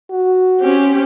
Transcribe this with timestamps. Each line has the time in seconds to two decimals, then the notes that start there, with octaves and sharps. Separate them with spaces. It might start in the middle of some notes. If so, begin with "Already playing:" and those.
0.10 F#4
0.61 C4 C#4 G4